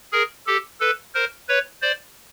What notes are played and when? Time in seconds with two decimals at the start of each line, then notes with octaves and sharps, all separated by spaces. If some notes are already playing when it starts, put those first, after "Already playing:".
0.12 G#4 A#4
0.47 G4 A4
0.80 A4 B4
1.15 A#4 C5
1.49 B4 C#5
1.82 C5 D5